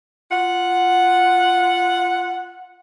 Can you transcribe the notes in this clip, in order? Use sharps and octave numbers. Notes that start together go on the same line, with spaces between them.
F4 F#5